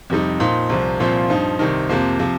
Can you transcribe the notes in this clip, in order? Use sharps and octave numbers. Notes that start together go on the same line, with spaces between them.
F2 C3 G3 D#4
A#2 F3 D#4
C2 C3 F3
C2 A#2 F3 C4 F4
G2 F3 D#4
C2 C3 D#3
F2 C3 F3 A#3
C3 F3